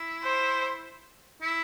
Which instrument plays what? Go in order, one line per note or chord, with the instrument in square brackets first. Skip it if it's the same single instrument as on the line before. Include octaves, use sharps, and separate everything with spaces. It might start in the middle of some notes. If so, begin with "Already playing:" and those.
Already playing: [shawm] E4
[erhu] C5
[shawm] E4